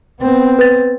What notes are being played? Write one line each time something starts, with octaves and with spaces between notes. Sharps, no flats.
B3 C4
B4 A6